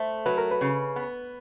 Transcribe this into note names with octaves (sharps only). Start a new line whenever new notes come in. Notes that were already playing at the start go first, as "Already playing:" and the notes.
Already playing: A3 C5
F#3 B4
A#4
B4
C#3
B3